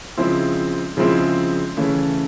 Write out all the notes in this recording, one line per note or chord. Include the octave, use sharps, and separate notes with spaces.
C#3 F3 G#3 C4 E4
C#3 F3 G#3 C4 E4
C#3 E3 A3 C#4 E4